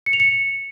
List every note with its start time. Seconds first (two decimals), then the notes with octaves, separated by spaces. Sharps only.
0.06 C#7
0.13 F7
0.20 C#7